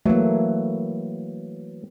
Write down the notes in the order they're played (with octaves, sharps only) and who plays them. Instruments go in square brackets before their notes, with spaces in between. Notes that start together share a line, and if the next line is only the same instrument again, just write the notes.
[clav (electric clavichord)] E3 F#3 [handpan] A3 A#3